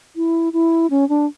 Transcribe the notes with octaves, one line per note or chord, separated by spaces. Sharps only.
E4
E4
C#4
D4